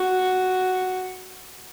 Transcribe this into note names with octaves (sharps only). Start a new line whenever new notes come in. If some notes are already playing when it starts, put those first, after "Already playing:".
Already playing: F#4